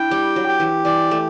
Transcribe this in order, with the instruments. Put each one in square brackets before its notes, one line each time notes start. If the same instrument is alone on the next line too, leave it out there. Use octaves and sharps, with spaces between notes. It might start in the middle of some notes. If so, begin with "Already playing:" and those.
Already playing: [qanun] D4 E4 [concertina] G5
[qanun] G3 [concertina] G4
[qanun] F#3
[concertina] G4
[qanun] E3
[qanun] E3 [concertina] D5
[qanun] A3